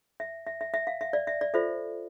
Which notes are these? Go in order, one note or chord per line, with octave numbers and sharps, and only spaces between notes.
E5
E5
E5
E5
F5
E5
D5
E5
D5
F4 A4 C5 E5